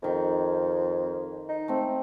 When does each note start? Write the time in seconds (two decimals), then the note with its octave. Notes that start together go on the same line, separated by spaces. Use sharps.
0.02 F2 D#3 D#5
1.49 D#4
1.68 A3 C4